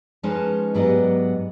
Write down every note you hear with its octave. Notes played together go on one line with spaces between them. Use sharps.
F3 G#3 C#4 D#4 B4 C5
G#2 F#3 B3 G4 D5 D#5